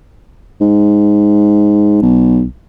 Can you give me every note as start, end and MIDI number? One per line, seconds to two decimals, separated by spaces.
0.61 2.01 44
2.02 2.44 35